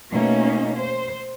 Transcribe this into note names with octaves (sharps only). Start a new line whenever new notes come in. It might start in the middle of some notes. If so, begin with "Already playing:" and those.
B2 A3 A#3 C#4 D#4
C5